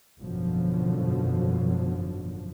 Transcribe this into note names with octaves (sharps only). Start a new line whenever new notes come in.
G#1 F#2 B2 D3 F3 F#3